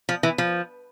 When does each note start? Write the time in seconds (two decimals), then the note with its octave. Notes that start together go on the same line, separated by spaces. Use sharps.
0.09 F3
0.23 E3
0.38 F3